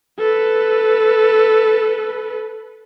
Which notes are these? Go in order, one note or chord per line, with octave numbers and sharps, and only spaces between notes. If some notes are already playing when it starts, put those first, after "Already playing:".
A4 B4